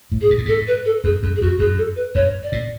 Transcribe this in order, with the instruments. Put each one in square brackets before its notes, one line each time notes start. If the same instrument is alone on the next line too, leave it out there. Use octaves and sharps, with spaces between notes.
[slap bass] A2
[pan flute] G#4
[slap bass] G#2
A2
[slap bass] G#2 [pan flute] A4
[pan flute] B4
A4
[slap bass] F#2 [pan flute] G#4
[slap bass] F#2
[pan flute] G#4
[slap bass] F2 [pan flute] F#4
[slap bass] F#2 [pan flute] G#4
[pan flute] A4
B4
[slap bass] F#2 [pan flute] C#5
[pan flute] D5
[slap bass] A2